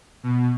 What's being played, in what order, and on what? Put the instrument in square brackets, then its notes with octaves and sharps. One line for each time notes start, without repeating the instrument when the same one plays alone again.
[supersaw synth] B2